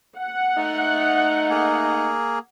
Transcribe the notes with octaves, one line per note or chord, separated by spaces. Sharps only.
F#5
A3 D#4
A#3 G#4